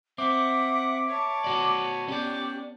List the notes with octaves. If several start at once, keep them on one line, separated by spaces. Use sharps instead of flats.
C4 E5 F#5 D6
C#5 A5
B3 F#4 D5
B3 C#4 G4 D5